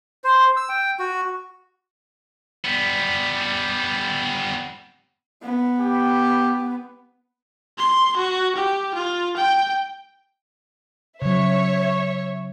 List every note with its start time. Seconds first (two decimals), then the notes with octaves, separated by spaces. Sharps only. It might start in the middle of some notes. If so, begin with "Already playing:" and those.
0.24 C5
0.57 E6
0.69 G5
0.99 F#4
2.65 G3 B3
5.42 B3
5.81 G4
7.78 C6
8.17 F#4
8.56 G4
8.95 F4
9.36 G5
11.22 C#3 F#3 C#5 E5